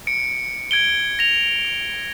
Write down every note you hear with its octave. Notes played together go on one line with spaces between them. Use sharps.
C#7 D7
G#6 D7 G7
A#6 F7